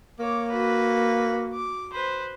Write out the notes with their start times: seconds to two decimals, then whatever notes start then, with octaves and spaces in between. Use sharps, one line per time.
0.19 A#3 C#5 D6
0.51 F#4 B4
1.53 D6
1.93 B4 C5